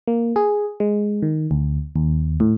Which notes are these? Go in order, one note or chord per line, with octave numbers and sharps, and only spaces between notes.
A#3
G#4
G#3
D#3
D2
D#2
A2